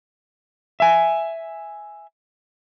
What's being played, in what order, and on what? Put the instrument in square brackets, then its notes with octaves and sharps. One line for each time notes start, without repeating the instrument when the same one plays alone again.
[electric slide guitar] E5 G#5